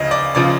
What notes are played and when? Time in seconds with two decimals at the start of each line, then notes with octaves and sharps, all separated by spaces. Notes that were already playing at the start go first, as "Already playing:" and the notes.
Already playing: D2 C#3 F3 D#5
0.11 D5
0.35 C#3 F3 D5